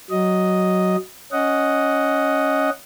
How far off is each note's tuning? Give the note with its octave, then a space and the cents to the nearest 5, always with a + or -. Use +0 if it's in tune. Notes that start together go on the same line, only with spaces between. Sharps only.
F#3 +5 D#5 +0
C#4 +0 D#5 +0 F#5 +0